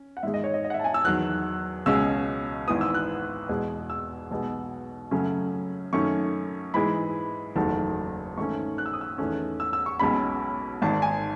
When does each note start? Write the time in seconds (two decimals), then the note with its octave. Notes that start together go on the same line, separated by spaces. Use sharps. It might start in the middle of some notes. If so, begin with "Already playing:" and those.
Already playing: C#4
0.17 F#5
0.23 G#2 D#3 G#3 E5
0.34 D#5
0.44 C#5
0.54 D#5
0.64 D#5
0.70 F#5
0.74 E5
0.79 A5
0.84 G#5
0.94 E6
1.05 E2 D#3 F#3 F#6
1.86 C#2 B2 G#3 C#4 E6
2.67 G#1 G#2 E3 B3 D#6
2.81 E6
2.94 F#6
3.49 E2 B2 G#3
3.90 E6
4.31 B1 B2 G#3 B3
5.11 F#2 C#3 F#3 A3 C#4
5.93 F#2 D#3 A3 C#4 C#6
6.74 G#2 E3 G#3 B5
7.56 F#1 E2 D#3 F#3 A3 A5
8.38 G#2 D#3 A3 C#4 C#6
8.78 F#6
8.86 E6
8.93 D#6
9.01 E6
9.18 E2 D#3 A3 C#4
9.60 E6
9.73 E6
9.86 C#6
10.00 B1 B2 G#3 C#4 B5
10.82 G#1 G#2 D#3 A5
11.02 G#5